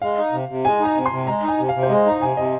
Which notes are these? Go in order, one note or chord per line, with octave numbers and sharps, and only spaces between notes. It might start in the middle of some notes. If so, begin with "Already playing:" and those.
G#3 F5
D#4
C3
C3
G#3 G#5
D#4
A#5
C3
C6
C3
G#3 A#5
D#4
G#5
C3
F5
C3
C5
G#3 D#5
D#4 A#5
C3 G#5
C3 D#5